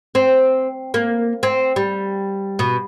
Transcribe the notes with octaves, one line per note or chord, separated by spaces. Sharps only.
C4
A#3
C4
G3
B2